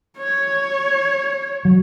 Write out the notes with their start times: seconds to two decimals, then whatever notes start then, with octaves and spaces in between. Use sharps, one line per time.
0.18 C#5
1.65 F#3